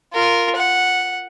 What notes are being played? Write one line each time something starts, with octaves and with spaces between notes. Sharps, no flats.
F4 A#4
F#5